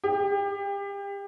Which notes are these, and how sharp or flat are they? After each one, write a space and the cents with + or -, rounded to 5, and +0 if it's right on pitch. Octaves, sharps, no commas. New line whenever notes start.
G4 +30